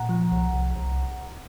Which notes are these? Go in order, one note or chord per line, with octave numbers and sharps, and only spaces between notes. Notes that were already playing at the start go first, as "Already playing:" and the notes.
Already playing: A#2 F#5 A#5
F3
C2
C2
C2